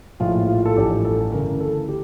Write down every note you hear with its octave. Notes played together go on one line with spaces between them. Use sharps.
A#1 A2 F3 F4
F4
A4
A1 G2 F3 G4
A4
D2 C#3 E3 A#4
A4
G4